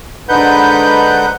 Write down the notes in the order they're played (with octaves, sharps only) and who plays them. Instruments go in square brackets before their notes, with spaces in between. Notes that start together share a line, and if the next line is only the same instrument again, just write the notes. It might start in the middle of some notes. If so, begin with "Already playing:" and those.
[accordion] G#2 D3 D#4 B4 F#5 G6